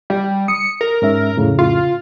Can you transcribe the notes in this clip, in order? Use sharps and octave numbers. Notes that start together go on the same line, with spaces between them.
G3
D#6 C#7
A#4
G#2 C#4 E5
F2 A2 C#3
F4